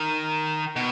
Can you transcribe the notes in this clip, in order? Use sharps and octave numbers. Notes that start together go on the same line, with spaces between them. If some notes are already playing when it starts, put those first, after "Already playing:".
Already playing: D#3
B2